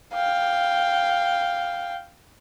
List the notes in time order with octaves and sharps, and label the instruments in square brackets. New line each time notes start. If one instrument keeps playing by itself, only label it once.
[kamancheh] F5 G5